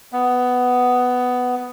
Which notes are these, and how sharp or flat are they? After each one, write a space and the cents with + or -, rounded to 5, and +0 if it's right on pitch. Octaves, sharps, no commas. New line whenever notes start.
B3 +10